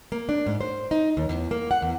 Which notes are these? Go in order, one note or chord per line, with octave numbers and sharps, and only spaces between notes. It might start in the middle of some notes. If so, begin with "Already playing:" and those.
A#3
D4
G#2
C5
D#4
D#2
E2
A#3
F#5
E2